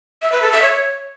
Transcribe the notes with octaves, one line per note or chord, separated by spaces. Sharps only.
E5
B4
A4
E5
C#5